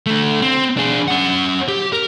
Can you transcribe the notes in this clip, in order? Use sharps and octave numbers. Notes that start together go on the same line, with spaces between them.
D3 A3
C4
D4 G#4
C#4 F#5
G4
A#4